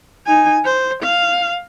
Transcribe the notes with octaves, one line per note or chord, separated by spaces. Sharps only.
D#4 G#5
C5
F5